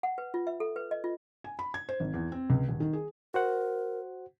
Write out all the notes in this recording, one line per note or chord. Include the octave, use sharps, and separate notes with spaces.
F#5
B4
F4
E5
A4
B4
D#5
F4
G#5
B5
G#6
C5
G#1
E2
C4
C#2
D#1
D#3
G#4
F#4 A#4 C5 F#5